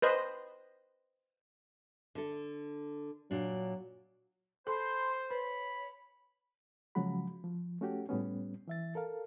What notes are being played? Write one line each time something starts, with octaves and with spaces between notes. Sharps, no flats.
B4 C5 D#5
D3 A4
A#2 F#3 D4
A4 C5 A5 B5 C6
B4 C#5 B5
C#3 F3 F#3 G#3 F#4 B5
F3
A3 C#4 F#4 G4
A2 G3 B3 C#4
E3 E5 A6
A4 A#4 F5